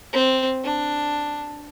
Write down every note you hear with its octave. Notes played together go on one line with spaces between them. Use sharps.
C4
D4